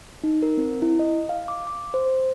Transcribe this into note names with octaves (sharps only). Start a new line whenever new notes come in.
D#4
A#4
C4
E4
D#5
F5
D6
D6
C5